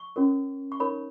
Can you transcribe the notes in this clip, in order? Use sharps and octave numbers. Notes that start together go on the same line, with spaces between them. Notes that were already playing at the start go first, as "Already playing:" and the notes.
Already playing: C#6
C#4 F#4 A#4 C#5
C#6
D#4 A#4 C#5 B5